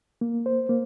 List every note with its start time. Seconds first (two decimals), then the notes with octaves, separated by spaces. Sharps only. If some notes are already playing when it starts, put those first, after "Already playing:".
0.21 A#3
0.46 C5
0.69 A#3